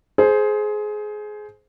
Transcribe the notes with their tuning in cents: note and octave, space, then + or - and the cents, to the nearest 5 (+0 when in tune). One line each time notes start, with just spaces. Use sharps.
G#4 +20 C5 +0